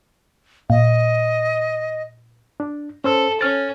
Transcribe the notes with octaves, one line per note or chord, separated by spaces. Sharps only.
A#2 D#5
D4
C#4 A4 C5 E6
C#4 F6 A6